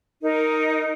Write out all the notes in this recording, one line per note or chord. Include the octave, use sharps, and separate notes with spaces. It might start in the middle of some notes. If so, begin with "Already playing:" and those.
D#4 A#4